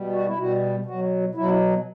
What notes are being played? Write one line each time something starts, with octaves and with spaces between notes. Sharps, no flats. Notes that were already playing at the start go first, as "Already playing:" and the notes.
Already playing: B2 G3
F#4
E4
B2 G3 F#4
B2 F#3 F#4
B2 F#3 E4